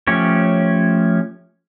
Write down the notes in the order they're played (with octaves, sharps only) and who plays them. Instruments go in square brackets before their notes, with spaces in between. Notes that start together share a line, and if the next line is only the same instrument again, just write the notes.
[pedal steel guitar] F3 A3 C#4 G4 C#5